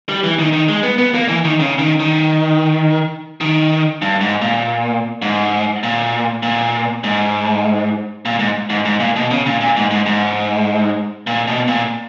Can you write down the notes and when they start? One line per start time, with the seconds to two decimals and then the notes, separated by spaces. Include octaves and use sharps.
0.09 G3
0.23 E3
0.39 D#3
0.53 D#3
0.69 G#3
0.83 B3
0.98 B3
1.15 A#3
1.29 E3
1.45 D#3
1.60 C#3
1.79 D#3
2.00 D#3
3.41 D#3
4.02 G2
4.21 G#2
4.42 A#2
5.22 G#2
5.83 A#2
6.43 A#2
7.04 G#2
8.25 A#2
8.39 G#2
8.70 G#2
8.85 G#2
9.00 A#2
9.16 B2
9.31 C#3
9.46 A#2
9.61 A#2
9.77 G#2
9.91 G#2
10.06 G#2
11.27 A#2
11.48 B2
11.68 A#2